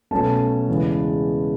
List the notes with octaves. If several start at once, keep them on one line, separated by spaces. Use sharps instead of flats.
B2 F#3 A3 C#4 A5
E2 C#3 G#3 B3